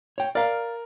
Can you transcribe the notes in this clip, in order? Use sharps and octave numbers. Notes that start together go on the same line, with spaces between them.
C#5 G5
A#4 D5 F5